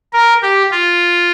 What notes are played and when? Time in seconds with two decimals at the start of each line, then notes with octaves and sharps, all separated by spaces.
0.13 A#4
0.43 G4
0.71 F4